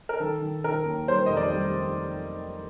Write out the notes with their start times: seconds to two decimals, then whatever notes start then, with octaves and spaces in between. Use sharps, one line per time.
0.09 A#4
0.20 D#3 A4
0.41 D#3
0.64 D#3 A#4
0.85 D#2
1.08 G3 C5
1.26 F1 D#5
1.37 D5
1.52 G3